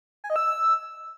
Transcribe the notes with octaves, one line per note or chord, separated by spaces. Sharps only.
G#5
D#5
E6